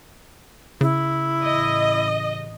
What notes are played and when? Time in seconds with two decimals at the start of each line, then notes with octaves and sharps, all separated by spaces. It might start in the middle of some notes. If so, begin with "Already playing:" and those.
0.81 C#3 E4
1.44 A1 D#5